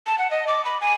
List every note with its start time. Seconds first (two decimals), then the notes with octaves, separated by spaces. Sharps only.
0.07 A5
0.18 F#5
0.31 D#5
0.47 D6
0.65 B5
0.81 G#5